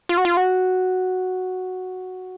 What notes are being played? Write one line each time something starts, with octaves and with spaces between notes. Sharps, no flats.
F4
F#4
F4
F#4